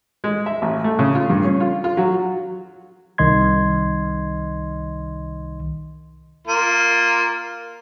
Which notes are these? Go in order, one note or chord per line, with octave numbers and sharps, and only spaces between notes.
G#3
E5
A1
A3
C#3
F4
G2
C#4
F4
F4
F#3
C2 D#3 D#5 C6 G#6
A#3 F4